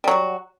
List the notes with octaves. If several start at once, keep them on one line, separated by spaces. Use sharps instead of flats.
F#3 G3 F#4